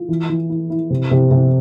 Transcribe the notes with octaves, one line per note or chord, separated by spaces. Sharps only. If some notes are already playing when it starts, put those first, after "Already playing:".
Already playing: F4
E3
E3
E4
E4
C3
C3
C3